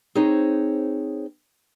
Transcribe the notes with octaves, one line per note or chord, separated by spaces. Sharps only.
C4 D#4 G#4 C5 C#5